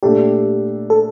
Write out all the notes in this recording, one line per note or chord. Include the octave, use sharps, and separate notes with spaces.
A#2 A3 D4 G4 A4
A4